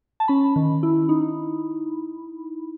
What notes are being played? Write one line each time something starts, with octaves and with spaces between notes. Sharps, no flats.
A5
C#4 B5
D#3
E4
D#4